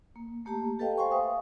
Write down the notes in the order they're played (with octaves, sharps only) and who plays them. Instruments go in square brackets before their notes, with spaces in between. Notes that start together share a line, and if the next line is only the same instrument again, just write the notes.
[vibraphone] A#3
A3 A#3 G4 A5 A#5
G4 A4 B4 D#5 F5 G5
C5 F5 G5 G#5 C6 C#6
B4 E5 F5 D#6